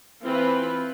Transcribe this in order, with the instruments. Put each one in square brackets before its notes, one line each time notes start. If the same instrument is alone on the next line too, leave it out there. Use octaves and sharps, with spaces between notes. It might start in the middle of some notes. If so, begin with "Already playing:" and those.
[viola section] E3 C4 F4 B4